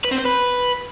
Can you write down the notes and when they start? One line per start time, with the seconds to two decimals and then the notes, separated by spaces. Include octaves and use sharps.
0.05 B4
0.12 C4
0.18 C5
0.25 B4